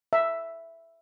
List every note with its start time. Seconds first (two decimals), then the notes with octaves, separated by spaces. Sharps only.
0.13 E5